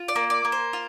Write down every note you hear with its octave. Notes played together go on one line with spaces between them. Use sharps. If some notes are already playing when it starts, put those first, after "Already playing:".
Already playing: F4
D5
A#3
D5
A#3
C5
F4